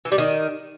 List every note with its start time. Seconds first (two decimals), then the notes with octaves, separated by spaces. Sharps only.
0.05 E3
0.12 G3
0.18 D#3